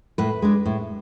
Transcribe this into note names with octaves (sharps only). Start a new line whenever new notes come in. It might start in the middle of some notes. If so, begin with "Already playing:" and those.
A2 B4
G#3 D4
A2